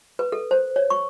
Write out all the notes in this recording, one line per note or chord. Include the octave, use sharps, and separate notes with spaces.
B4
A4
C5
C#5
C#6